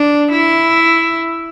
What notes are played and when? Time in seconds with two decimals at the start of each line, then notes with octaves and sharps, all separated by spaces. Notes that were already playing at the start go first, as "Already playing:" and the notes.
Already playing: D4
0.31 E4